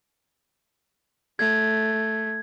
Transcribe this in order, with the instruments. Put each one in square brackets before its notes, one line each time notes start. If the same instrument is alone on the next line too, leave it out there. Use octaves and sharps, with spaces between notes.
[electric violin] A3 [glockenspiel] G#6